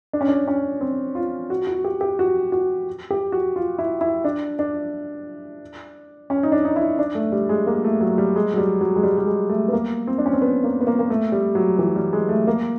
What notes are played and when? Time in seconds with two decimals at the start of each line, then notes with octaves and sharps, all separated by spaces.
0.13 D4
0.21 C#4
0.28 D4
0.48 C#4
0.81 C4
1.15 F4
1.50 F#4
1.67 F#4
1.84 G4
2.01 G4
2.19 F#4
2.52 F#4
3.10 G4
3.32 F#4
3.56 F4
3.79 E4
4.01 E4
4.24 D4
4.59 D4
6.30 C#4
6.43 D#4
6.52 D4
6.65 D#4
6.76 E4
6.99 D4
7.15 A3
7.32 G3
7.49 G#3
7.67 A#3
7.84 A3
8.01 F#3
8.18 G3
8.36 G#3
8.54 F#3
8.58 G3
8.81 F#3
8.96 G#3
9.03 G3
9.18 G3
9.27 G#3
9.49 A3
9.68 B3
9.73 A#3
10.07 C4
10.18 D4
10.26 C#4
10.33 C4
10.42 B3
10.64 A#3
10.81 B3
10.87 A#3
10.99 A#3
11.10 A3
11.32 G3
11.55 F#3
11.79 E3
11.96 G3
12.13 G#3
12.29 A3
12.47 A#3